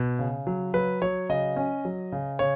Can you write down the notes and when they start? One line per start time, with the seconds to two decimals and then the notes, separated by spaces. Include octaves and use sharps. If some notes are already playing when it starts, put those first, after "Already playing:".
Already playing: B2
0.19 C#3
0.47 F#3
0.74 F#3 B4
1.02 F#3 C#5
1.29 C#3 D#5
1.56 C#4
1.85 F#3
2.12 C#3
2.39 C#3 C#5